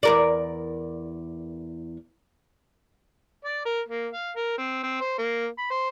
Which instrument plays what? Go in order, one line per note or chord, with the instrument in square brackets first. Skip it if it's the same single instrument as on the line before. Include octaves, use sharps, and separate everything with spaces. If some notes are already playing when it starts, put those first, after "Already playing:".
[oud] E2 A#4 D5
[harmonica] D5
A#4
A#3
F5
A#4
C4
C4
C5
A#3
B5
C5